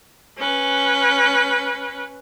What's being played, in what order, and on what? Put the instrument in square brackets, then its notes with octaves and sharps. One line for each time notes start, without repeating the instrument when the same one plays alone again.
[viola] C#4 B4